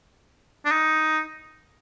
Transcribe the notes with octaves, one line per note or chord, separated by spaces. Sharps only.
D4
D#4